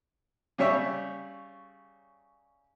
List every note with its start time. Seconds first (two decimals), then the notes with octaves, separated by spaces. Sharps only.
0.58 C#3 G3 C#5 E5 C#6